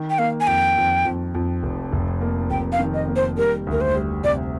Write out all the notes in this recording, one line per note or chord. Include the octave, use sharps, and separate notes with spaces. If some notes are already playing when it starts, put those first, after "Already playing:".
Already playing: D#3
G5
A#3 F5
G#5
F2 G5
F2
F2
F2
F1
F1
A#3
F1 G5
F5
D#3
D#5
A#3
C5
G3 A#4
D2 A#4
C5
G3
C3 D5